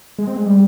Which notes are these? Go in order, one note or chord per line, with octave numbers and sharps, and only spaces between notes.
G#3
C4
G#3
G3